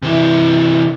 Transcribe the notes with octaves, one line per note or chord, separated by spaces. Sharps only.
C3 E3